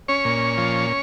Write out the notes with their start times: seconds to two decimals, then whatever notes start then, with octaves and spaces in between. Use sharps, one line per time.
0.08 C#4 C#5
0.25 A#2
0.58 F3